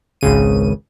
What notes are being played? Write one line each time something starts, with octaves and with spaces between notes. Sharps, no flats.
G#1 C#2 C#3 D#7